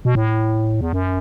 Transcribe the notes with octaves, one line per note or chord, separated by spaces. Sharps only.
B2
A2
E2
F#2